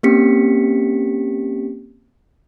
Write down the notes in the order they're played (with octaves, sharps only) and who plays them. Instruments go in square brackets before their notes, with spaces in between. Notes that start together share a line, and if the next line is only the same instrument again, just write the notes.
[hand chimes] A#3 C4 C#4 G4 B6 C#7